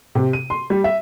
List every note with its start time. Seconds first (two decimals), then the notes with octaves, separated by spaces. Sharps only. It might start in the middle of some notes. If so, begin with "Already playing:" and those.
0.15 C3
0.33 D#7
0.50 C6
0.70 G3
0.84 E5